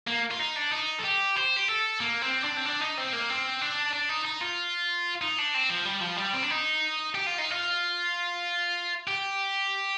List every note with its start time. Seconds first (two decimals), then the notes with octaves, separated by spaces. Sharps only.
0.08 A#3
0.31 F4
0.40 D#4
0.56 D4
0.73 D#4
1.00 A4
1.04 G4
1.36 C5
1.56 G4
1.68 A4
2.00 A#3
2.22 C4
2.44 D4
2.56 C4
2.65 D4
2.81 D#4
2.98 C4
3.13 A#3
3.30 C4
3.61 D4
3.93 D4
4.09 D#4
4.25 D#4
4.41 F4
5.22 D#4
5.38 D4
5.54 C4
5.70 F3
5.86 G3
6.02 F3
6.18 G3
6.34 C4
6.43 D4
6.51 D#4
7.15 G4
7.27 F4
7.38 D#4
7.51 F4
9.08 G4